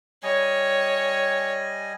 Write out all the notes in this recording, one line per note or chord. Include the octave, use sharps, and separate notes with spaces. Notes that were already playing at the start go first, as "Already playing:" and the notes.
G3 C#5 D#5 G#5